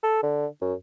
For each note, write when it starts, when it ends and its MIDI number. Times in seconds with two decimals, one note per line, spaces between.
0.03 0.22 69
0.23 0.46 50
0.61 0.74 42